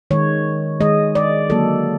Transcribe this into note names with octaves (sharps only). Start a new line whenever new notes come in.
D#3 G#3 C#5
D#3 G#3 D#5
D5
D3 F#3 A#3 A4